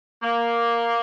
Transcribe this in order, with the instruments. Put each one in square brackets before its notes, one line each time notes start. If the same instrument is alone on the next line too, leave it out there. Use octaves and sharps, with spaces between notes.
[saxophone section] A#3